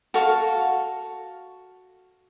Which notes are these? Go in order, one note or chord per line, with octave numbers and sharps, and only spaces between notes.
F#4 A4 F5 C#6